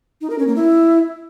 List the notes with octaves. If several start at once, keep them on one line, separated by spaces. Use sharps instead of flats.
D#4
A#4
C#4
A#3
E4